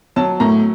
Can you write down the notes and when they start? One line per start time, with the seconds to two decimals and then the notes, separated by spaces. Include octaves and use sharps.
0.16 F#3 A5
0.40 A2 A#5